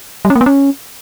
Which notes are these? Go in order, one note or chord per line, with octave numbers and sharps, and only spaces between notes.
G3
C#4
A#3
B3
C#4